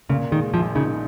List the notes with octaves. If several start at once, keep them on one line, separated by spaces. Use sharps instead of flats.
A#2 C#3
D#3 G#3
A#1 F3
C#3 D#4